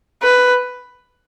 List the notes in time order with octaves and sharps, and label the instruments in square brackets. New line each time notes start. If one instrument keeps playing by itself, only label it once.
[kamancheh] B4